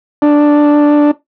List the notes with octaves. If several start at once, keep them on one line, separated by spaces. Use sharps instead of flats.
D4